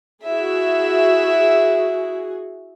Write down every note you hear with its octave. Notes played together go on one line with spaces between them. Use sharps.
E4 F#4 G#4 E5